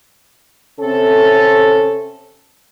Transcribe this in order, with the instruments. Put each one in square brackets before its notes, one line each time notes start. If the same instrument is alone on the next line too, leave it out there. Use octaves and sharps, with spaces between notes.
[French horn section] C3 C4 C#4 A4